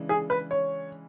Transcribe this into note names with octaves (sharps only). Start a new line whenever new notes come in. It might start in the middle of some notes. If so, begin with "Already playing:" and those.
Already playing: C#3 E3 G#3 D4
G#4
B4
C#5